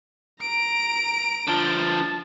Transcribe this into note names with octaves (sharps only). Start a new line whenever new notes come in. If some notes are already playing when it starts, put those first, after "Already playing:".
A#5 D7
D3 F3 A5